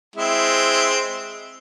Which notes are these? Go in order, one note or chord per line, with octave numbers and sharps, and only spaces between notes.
G#3 C4 E4